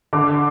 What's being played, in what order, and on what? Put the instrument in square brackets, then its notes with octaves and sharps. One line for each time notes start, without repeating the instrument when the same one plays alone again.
[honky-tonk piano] D3 D6